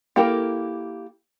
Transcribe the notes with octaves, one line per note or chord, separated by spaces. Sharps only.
A#3 E4 G4 A4 A#4